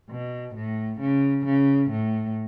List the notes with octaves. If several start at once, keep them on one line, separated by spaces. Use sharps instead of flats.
B2
A2
C#3
C#3
A2